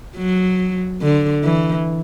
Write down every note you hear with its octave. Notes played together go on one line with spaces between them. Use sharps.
F#3
D3
E3